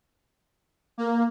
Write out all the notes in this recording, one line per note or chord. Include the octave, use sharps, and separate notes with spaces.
A#3